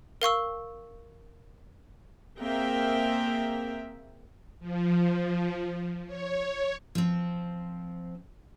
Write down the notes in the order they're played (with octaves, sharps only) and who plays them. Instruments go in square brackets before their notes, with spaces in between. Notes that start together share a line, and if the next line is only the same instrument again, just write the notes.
[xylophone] A#4 F5 C#6 E6
[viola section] A#3 C4 G#4 A#4 E5 G5
[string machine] F3
C#5
[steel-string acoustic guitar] F3 C4